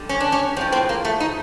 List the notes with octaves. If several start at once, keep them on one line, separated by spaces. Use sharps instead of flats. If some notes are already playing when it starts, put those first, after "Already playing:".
Already playing: D3 G3
C#4
D4
C#4
A2 F3 G#3 C4
C4
A#3
A3
D#4